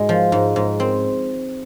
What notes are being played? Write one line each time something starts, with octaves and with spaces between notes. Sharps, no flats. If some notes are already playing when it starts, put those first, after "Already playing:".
Already playing: G#2 G#3 F#4
F3
G#2
G#2
C4